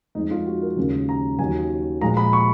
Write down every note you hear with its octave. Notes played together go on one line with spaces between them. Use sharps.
F2 F3 G#3 D#4
F4
F#4
A#4
D#2 C#3 G#3
A#5
D#2 D#3 F#3 G#5
A#2 F3 G#3 A#5
B5
C#6